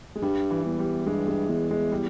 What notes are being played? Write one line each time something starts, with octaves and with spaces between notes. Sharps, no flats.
G#3
G2 G3
E3
E2
G3
G2 G#3
G#3
E2 G#3
G#3
G3